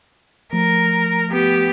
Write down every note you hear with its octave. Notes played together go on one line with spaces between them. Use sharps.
F3 A3 A#4
B3 G4